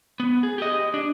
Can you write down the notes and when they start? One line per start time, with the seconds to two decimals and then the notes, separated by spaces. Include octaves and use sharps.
0.20 B3
0.43 G#4
0.58 G4 D#5
0.94 D4